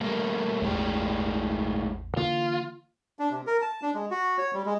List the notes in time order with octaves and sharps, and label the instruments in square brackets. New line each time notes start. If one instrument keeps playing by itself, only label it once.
[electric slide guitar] G3 A3 A#3
[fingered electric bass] A1 E2 [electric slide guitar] A2 G#3 G4
[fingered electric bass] D3 E3 A#3 [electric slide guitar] F4
[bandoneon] D4
C3
A#4
A5
D4
G#3
F#4
C#5
G3
G#3